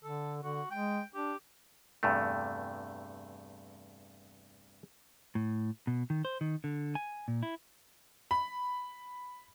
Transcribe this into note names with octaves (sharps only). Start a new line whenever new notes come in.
D3 A4
D3 F#4
G#3 G5
D4 G4
E2 G2 C3 A3
A2
B2
D#3
C5
D#3
D3
G#5
A#2
E4
B5